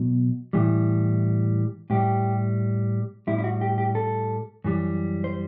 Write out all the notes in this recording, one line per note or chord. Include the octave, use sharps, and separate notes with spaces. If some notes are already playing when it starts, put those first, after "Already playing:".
Already playing: B2 F#3
A2 E3 G3
A2 G3 G4
A2 G3 E4
E4
F#4
G4
G4
A4
F#2 E3 G3
C5